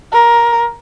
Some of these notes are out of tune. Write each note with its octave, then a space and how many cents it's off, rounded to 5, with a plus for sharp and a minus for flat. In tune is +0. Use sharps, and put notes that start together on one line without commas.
A#4 +15